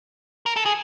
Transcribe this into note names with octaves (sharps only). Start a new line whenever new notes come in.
A#4
A4
G#4